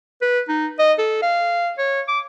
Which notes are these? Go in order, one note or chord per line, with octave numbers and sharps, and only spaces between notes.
B4
D#4
D#5
A4
F5
C#5
D6